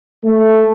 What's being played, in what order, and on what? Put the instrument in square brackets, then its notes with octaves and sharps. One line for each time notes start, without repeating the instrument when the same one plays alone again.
[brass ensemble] A3